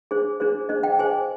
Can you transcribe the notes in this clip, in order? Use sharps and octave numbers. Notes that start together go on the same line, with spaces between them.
D4 G#4 C5
D4 G#4 C5
D4 G#4 C5 D#5
G5
D4 G#4 C5 G#5